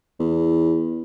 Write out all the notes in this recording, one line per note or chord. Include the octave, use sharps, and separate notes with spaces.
E2